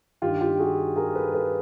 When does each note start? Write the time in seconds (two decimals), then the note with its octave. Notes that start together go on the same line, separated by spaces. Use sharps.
0.22 G2 D#3 F4 G4
0.41 F4 G4
0.59 F#4 G#4
0.96 G#4 A#4
1.15 A4 B4
1.33 A4 B4